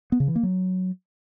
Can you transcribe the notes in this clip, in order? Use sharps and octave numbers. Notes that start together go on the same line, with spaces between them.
B3
C#3
E3
A#3
F#3